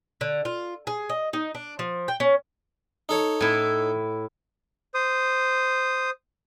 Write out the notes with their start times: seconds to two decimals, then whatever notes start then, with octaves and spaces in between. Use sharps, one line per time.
0.21 D3
0.45 F4
0.87 G#4
1.09 D#5
1.33 D#4
1.55 D4
1.79 F3
2.08 G5
2.20 C#4
3.09 D#4 A4 C#5
3.41 A2 E4
4.94 C5 D#6